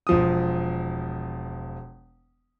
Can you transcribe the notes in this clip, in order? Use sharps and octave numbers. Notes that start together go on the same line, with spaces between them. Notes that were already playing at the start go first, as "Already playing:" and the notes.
E1 F3 D#6